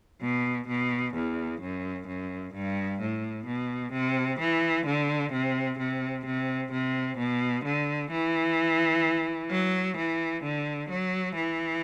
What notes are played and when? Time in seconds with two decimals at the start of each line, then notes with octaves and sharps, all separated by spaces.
0.22 B2
0.68 B2
1.15 E2
1.61 F#2
2.07 F#2
2.54 G2
3.00 A2
3.46 B2
3.92 C3
4.39 E3
4.86 D3
5.32 C3
5.79 C3
6.25 C3
6.71 C3
7.18 B2
7.64 D3
8.11 E3
9.50 F#3
9.97 E3
10.43 D3
10.90 F#3
11.36 E3